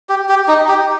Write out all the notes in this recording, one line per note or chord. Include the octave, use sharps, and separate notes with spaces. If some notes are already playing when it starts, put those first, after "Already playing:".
G4
G4
D#4
G4